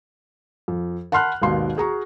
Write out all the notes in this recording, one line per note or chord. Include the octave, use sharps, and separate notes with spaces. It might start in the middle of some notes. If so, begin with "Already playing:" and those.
F2
F#5 A5 B5 C6 F6 F#6
G#1 D#2 B2 C6
F#4 G#4 A#5 C#6